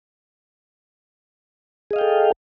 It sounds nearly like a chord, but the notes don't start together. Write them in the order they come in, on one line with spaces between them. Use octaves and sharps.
G#4 D#5 F5 G5 A4